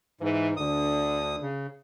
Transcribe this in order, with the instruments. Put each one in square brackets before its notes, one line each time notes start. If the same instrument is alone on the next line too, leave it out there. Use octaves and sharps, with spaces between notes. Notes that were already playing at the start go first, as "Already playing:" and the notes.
[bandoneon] G#2 [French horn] E3
[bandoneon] D2 D#6 [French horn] D3
[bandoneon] C#3